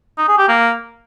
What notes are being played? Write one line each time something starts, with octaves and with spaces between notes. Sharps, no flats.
D#4
G#4
G4
A#3